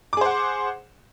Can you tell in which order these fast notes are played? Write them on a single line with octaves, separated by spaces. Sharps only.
D6 G#4 C5 F#5